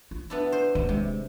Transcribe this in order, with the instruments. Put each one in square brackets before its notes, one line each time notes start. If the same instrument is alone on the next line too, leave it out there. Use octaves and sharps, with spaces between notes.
[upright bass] F4
[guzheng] B3 D4 E4
C5
[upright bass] D1 D#2
[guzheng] C3 [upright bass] G#3